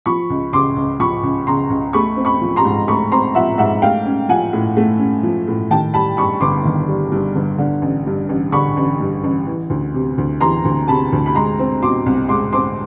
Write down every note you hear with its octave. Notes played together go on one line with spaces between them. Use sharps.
F3 B5 C#6
C#2
C#3 C6 D6
C#2
F3 B5 C#6
C#2
C#3 A#5 C6
C#2
A3 B5 C#6
C4
B5 C#6
F3
A#5 C6
G#2
A3 B5 C#6
C4 A#5 C6
F3 E5 F#5
G#2 E5 F#5
A3 F5 G5
C#4
F3 F#5 G#5
A2
A3
C#4
F3
A2
D#3 G5 A5
G3 A5 B5
G2 B5 C#6
G1 C6 D6
D#3
G3
G2
G1
D3
A1
G2
A1
D3 B5 C#6
A1
G2
A1
E3
D2
C3
D2
E3 A#5 C6
D2
C3 A5 B5
D2
B5
G#3 A#5 C6
C4
B2 C6 D6
C2
G#3 C6 D6
C4 C6 D6